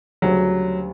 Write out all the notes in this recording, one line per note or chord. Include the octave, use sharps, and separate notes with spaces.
D2 C#3 F#3 G3